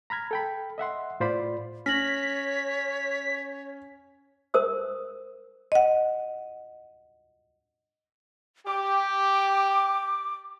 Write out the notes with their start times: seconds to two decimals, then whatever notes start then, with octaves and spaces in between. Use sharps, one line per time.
0.10 A#5 B5 F6 G#6
0.31 A4 G5 B5
0.78 D#5 E5 F#5 C6
1.20 A2 F4 C5 D5 B5
1.86 C#4 C#5 F6 A#6 B6 F#7
4.54 A#4 C5 D#6 E6
5.72 D#5 F#5
8.67 G4 D6